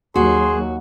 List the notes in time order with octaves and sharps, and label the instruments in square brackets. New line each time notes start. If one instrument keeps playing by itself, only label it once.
[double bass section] D#2 F#3 [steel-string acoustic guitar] F#4 [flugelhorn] G#4 [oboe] C6